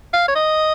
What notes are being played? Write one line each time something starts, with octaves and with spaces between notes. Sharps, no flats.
F5
C#5
D#5